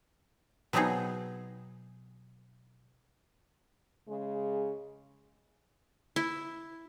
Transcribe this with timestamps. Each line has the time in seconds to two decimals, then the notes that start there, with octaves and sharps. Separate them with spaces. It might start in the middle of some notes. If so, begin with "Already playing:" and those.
0.73 B2 F#3 B3 C4 D#4 G#4
4.08 C#3 G#3
6.16 E4